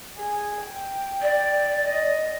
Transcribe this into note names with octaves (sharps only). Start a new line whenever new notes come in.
G#4
G5
D5
D#5